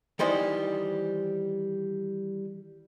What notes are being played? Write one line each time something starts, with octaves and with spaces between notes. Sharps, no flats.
D#3 E3 G3 C5 D#5